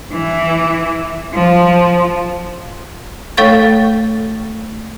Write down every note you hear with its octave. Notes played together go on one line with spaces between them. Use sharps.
E3
F3
A3 A4 C#5 F5 C#6 A6